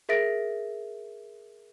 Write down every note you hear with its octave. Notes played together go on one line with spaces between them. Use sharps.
G#4 A#4 E5 A6 A#6 D7